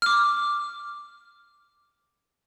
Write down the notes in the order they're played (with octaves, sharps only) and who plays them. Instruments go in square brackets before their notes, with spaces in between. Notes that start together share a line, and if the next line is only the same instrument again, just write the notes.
[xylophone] D6 F6